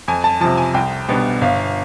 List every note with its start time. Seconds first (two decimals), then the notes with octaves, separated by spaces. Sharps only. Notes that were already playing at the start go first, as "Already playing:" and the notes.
0.08 F2 G#5
0.24 A5
0.41 C3 F3 A5
0.57 G#5
0.74 C2 G5
1.08 B2 G3 B3 D4
1.41 G1 F5